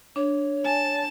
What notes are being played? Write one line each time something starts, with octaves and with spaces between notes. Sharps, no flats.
D4 C#5
G#5 A5